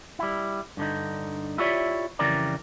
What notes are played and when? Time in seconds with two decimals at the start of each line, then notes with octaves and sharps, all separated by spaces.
0.19 G3 E4
0.77 G2 D3 D#4
1.58 E4 F4 G4 C#5 D5 E5
2.19 F2 C#3 E3 G3 A#4 D5